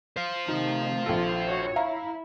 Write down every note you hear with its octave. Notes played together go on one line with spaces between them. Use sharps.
C5 F5
C3 D#3 A3 D#4
A#1 F4 A4
F#4 C#5
E4 E5 F5 A#5